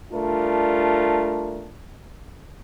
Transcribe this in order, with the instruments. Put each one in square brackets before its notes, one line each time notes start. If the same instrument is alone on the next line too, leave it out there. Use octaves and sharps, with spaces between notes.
[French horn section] G3 A3 D4 F4 A#4